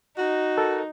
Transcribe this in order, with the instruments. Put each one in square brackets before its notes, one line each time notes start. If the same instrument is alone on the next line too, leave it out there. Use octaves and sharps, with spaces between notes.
[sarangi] D#4 [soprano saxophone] F#4
[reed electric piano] A4 A#4